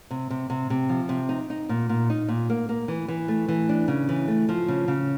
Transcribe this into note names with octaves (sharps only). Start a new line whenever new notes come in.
C3
C3
C3
C3
F3
C3
D#4
D#4
A#2
A#2
D#4
A#2
A#3
A#3
E3
E3
A3
E3
D4
C#3
E3
A3
F3
C#3
C#3